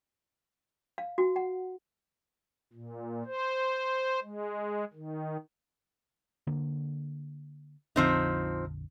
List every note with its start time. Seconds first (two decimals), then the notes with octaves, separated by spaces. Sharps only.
0.98 F5
1.18 F#4
1.36 F#5
2.73 A#2
3.26 C5
4.23 G#3
4.93 D#3
6.47 D3 A#3
7.96 A#1 F2 D3 F3 C4 D#4